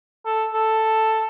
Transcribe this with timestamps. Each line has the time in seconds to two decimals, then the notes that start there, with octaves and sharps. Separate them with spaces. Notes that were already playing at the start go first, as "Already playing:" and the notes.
0.25 A4
0.54 A4